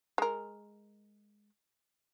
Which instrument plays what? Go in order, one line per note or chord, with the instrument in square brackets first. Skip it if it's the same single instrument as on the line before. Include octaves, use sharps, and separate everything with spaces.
[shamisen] G#3 A#4